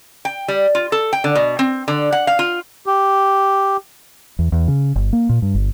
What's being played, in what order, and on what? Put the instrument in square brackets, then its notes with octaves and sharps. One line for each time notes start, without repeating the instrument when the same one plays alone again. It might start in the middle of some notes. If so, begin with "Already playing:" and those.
[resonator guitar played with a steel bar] G5
G3
F4
A4
G5
D3
B2
C4
D3
F#5
F5
F4
[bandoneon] G4
[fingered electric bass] E2
E2
C#3
G1
A#3
A#2
G2
G1